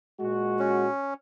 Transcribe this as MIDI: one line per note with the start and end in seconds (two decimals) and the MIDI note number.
0.20 0.87 46
0.20 0.87 56
0.20 0.87 66
0.59 1.14 61